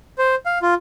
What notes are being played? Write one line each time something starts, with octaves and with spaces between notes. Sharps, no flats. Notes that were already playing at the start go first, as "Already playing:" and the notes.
C5
F5
F4